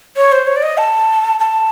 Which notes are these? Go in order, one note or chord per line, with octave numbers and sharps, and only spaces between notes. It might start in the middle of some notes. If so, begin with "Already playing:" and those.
C#5
C5
C#5
D5
D#5
A5
A5